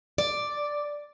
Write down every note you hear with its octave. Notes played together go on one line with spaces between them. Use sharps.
D5